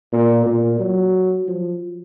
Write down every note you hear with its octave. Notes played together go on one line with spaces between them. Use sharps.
A#2
A#2
F#3
F3